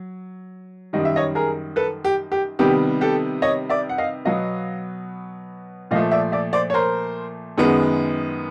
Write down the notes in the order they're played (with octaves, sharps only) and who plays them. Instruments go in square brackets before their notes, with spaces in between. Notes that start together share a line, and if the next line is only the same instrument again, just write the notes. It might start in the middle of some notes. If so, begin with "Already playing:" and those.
Already playing: [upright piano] F#3
F#2 D#3 G3 D#5
E5
C#5 D#5
G#4 A#4
A4 B4
G4
G4
C3 D#3 G3 B3 G4
G4 A4
C#5 D#5
D5 E5
F#5
D#5 F5
B2 F#3 B3 D#5 F5
A#2 F3 A3 D#5 F5
D5 E5
D5 E5
C5 D5
C#5
A#4 C5
F#2 D#3 G#3 B3